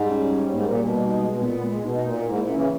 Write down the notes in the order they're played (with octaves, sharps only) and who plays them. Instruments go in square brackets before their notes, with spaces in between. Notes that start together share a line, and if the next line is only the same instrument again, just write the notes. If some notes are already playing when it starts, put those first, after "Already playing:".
Already playing: [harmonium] G#2 [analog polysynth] G3
[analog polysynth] C#4
G3
[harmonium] G#2 [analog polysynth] A#3
[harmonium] A#2
[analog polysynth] G3
[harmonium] B2
[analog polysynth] D#4
G#3
[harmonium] B2
[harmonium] A#2 [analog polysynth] B3
[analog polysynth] G#3
[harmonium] B2 [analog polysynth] D#4
[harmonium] A#2 [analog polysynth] A#3
[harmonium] G#2 [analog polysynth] E4
[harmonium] A#2
[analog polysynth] C#4
[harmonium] C#3 E3